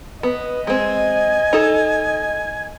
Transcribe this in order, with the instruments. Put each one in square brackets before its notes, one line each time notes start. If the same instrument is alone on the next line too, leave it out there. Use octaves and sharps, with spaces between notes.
[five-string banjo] B3 [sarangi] D#5
[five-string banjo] G#3 C4 [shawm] G#5
[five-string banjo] D#4 A4